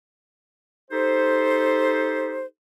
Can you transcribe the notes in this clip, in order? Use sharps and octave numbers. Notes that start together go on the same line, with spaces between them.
D#4 G4 A4 C5